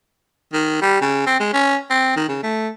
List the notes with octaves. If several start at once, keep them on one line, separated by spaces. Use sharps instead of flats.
D#3
G3
C#3
C4
G#3
C#4
C4
D#3
C#3
A3